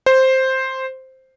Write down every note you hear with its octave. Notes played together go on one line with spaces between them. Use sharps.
C5